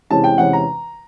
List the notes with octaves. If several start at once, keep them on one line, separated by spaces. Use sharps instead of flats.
E2 C3 E3 G#3 C#4 A5
G5
E2 C3 E3 G#3 C#4 F#5
A#5